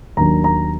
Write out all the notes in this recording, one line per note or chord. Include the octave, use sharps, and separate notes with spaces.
D#2 D#3 F#3 A#3 D4 A#5
A#5